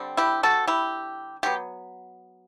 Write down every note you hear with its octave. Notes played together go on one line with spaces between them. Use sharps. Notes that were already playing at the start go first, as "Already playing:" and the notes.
Already playing: D3 G3 C4
E4 G4
F#4 A4
E4 G4
D3 F#3 B3 G4